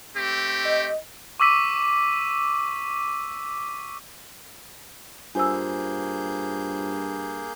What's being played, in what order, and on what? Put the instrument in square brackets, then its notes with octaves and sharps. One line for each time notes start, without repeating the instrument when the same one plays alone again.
[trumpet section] A3 C4 G4
[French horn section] D#5
[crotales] C#6 D6 E6 B6 D#7
[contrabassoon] G2 [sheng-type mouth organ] A#3 G#4 G6 [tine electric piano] F4 C5 [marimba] G#5 E6